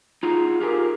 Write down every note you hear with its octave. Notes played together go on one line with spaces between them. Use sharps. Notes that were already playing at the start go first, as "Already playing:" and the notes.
D#4 F4 F#4 G#4
F4 G4 G#4 A#4